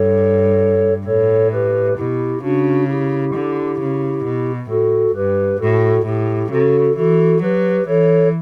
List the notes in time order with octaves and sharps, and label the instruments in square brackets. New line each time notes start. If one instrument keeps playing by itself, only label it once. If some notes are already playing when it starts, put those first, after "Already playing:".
Already playing: [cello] G2 [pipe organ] A4 C#5
[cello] A2 [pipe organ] A4 C#5
[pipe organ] G4 B4
[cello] B2 [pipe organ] E4 G4
[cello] C#3 [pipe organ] D4 F#4
[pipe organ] E4 G4
[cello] D3
C#3
B2
[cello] A2 [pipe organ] F#4 A4
[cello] G2 [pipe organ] G4 B4
[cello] A2 [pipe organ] F#4 A4
[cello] A2 [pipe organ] E4 G4
[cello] C#3 [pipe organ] F#4 A4
[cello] E3 [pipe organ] F#4 A4
[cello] F#3 [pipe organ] G4 B4
[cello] E3 [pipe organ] A4 C#5